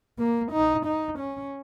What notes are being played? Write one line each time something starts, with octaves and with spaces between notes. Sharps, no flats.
A#3
D#4
D#4
C#4